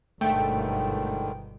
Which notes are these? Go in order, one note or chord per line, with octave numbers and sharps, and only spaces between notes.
G1 G#2 B2 D3 D#3 A3 G5